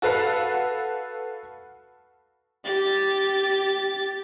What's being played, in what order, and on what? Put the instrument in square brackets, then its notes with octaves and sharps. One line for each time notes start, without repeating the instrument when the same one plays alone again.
[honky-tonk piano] F#4 A4 B4 F5 F#5
[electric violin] G4 A6